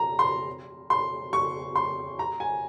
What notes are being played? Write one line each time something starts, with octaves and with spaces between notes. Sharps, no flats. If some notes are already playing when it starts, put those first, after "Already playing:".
Already playing: A#5
C6
C6
C#6
C6
A#5
G#5